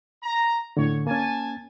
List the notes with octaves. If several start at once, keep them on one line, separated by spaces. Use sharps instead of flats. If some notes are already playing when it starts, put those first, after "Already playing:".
A#5
A2 D3 C#5
A#3 C#4 G#5 A5